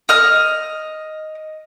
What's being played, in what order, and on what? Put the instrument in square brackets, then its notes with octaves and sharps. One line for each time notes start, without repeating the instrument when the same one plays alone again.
[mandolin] D#5 F6